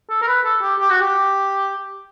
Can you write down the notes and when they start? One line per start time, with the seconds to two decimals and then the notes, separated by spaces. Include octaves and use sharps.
0.10 A4
0.22 A#4
0.27 B4
0.44 A4
0.62 G4
0.79 G4
0.90 F#4
1.01 G4